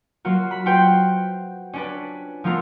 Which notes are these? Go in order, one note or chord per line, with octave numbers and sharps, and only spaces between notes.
F#3 A#3 F4 F#4
B5
F4 F#4 B4 C5 G5
C#4 D4 B4
F3 A3 B3 F4 A#4